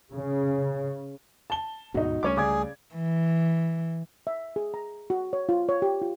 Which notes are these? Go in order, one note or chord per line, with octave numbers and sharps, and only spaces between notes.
C#3
A5 G7
D2 G#2 B2 D#4 F#4
C#2 G3 A3 C#4 C#5 D6
C#3 G#4 D5 D6 G#6
E3
E5
G#4
A#5
F#4
C#5
F4
C#5
G4
F4